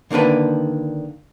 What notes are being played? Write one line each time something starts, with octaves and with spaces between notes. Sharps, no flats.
D3 D#3 A#3 D4 B4